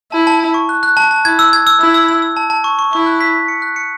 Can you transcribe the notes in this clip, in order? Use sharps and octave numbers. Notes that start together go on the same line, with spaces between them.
E4 A5
A5
A5
C#6
F#6
F#6
A5
A5
E4 G#6
E6
G#6
E6
E4 E6
E6
E6
E6
A5
A5
C#6
C#6
E4 C#6
F#6
B6
B6
C#7
F#6
C#7